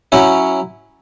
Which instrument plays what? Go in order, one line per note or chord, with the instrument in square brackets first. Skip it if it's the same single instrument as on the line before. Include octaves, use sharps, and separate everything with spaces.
[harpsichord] F#3 C#4 E4